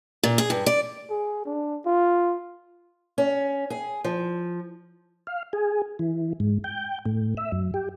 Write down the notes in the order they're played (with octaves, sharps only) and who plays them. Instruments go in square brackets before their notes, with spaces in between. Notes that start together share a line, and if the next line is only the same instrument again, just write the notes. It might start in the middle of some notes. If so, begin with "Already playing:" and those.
[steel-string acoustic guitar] A#2
G#4
G2
D5
[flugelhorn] G#4
D4
F4
[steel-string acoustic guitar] C#4
G#4
F3
[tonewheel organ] F5
G#4
E3
G#2
G5
A2
E5
F#2
G4